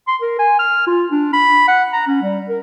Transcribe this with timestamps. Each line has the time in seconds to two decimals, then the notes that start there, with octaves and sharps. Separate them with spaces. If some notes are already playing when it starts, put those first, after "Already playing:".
0.08 C6
0.22 A#4
0.39 G#5
0.59 F6
0.87 F4
1.12 D4
1.33 B5
1.68 F#5
1.93 A#5
2.08 C#4
2.23 G3
2.49 A#4